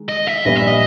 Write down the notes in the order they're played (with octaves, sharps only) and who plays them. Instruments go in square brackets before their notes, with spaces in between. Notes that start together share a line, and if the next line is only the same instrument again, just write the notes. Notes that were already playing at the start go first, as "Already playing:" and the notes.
Already playing: [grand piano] D#3 G#3
[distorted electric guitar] D#5
E5
[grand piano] A#1 A#2 G3 B3 [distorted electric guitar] D#5
[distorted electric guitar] E5
D#5